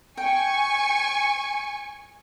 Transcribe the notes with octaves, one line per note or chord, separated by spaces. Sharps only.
G5 G#5 C#6